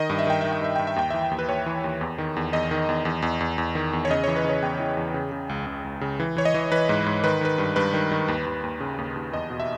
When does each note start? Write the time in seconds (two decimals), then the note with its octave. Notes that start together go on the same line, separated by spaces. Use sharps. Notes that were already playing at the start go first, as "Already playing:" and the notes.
Already playing: D#3 D#5
0.10 G2
0.19 E5
0.27 D#3 G5
0.41 D#3 E5
0.53 G5
0.61 G2 E5
0.76 G2 G5
0.87 E5
0.96 D#2 G5
1.10 E3 E5
1.31 D#2
1.39 B4
1.49 D#2 C#5
1.66 E3
1.84 D#2
2.01 E2
2.18 D#3
2.36 E2
2.53 E2 D#5
2.71 D#3
2.89 E2
3.05 E2
3.22 E2
3.41 E2
3.58 E2
3.75 D#3
3.93 E2
4.05 C#5
4.10 C#3 D#5
4.24 E3 C#5
4.36 B4
4.45 C#3 C#5
4.62 E2 G5
4.79 E3
4.97 E2
5.14 C#3
5.32 C#3
5.49 C#2
5.66 C#2
5.84 C#2
6.01 C#3
6.20 E3
6.37 E3 C#5
6.45 D#5
6.54 E3
6.72 E3 B4
6.89 G#2
7.06 G#2
7.24 D#3 B4
7.41 D#3 B4
7.58 G2
7.76 G2 B4
7.94 D#3
8.12 D#3
8.28 D#2
8.46 D#2
8.64 D#2
8.80 C#3
8.98 D#2
9.16 D#2
9.33 E2 D#5
9.50 B2
9.60 E5